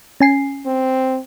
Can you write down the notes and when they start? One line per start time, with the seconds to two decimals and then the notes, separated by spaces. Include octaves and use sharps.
0.20 C#4 G#5 C7
0.66 C4